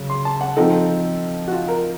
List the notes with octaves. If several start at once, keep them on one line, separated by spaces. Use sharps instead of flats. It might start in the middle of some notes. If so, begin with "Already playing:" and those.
Already playing: C#3 F#3
C6
A5
F#5
F3 C4 D#4 A4
F#4
F4
A#4